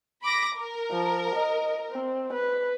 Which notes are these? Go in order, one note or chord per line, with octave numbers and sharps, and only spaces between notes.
B5 D6 A#6
A#4
F3
D#5
C4
B4